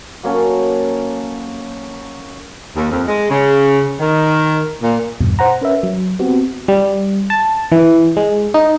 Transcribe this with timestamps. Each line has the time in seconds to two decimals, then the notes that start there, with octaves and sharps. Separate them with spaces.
0.23 F#3 A#3 C#4 A4
2.76 D#2
2.92 F2
3.08 G#3
3.30 C#3
4.00 D#3
4.82 A#2
5.21 E2 G2 B2
5.39 C5 F#5 A#5
5.61 C#4 A#4 B4 E5
5.83 F#3
6.19 B3 C4 F#4 G4
6.68 G3
7.30 A5
7.72 E3
8.17 G#3
8.54 D#4